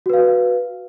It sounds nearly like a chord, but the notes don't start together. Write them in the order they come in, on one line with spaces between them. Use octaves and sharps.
F#4 B4 F5